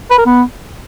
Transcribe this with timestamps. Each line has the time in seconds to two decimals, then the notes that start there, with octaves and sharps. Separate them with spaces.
0.11 B4
0.18 A#4
0.26 B3